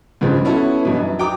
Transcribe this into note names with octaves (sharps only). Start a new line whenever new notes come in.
C#2 G2 C#3 F3 G#3
B3 C#4 E4 F#4 A4
G2 B2 E3
F#2
F#3 G5 A#5 D6 D#6